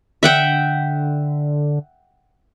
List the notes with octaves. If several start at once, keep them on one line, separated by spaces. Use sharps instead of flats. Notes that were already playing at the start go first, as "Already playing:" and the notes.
D3 E5 F#5 G5